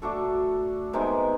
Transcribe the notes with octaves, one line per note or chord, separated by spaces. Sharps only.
A3 D4 F#4 A4
C3 D#3 G#3 B3